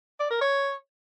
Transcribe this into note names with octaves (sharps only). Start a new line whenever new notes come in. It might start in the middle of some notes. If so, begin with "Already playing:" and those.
D5
A#4
C#5